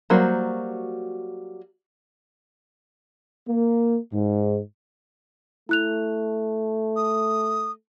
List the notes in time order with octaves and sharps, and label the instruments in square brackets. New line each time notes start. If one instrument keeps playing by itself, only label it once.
[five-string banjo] F#3 G3 A#3 F#4 C5
[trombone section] A#3
G#2
[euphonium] A3 [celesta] E4 F#6 F7
[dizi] D#6